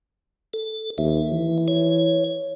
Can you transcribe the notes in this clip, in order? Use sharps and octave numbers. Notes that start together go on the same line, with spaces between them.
A4
D#2 E5
E3
C#5